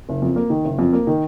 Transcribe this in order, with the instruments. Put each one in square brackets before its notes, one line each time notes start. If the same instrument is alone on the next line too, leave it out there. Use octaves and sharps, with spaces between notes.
[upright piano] F#1
F2
A#3
D#3
F#1
F2
A#3
D#3